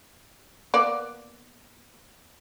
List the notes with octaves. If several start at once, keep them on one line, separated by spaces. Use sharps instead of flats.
A#3 B3 D5